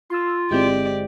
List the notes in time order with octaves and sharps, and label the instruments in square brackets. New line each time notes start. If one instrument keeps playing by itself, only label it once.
[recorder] F4 [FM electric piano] C6 E6
[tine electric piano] G1 G#3 G6 [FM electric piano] C4 E4 [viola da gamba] G4 D5